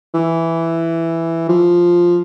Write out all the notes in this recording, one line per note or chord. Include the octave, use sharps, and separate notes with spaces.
E3
F3